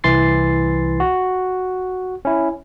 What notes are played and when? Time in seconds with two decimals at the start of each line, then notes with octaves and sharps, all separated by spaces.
0.04 C2 E3 C6 A6 C7
1.00 F#4
2.25 C#4 E4